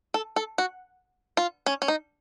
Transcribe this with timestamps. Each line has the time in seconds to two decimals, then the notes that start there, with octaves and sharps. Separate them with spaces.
0.14 A4
0.36 A4
0.58 F#4
1.37 F4
1.66 C#4
1.82 C#4
1.88 D#4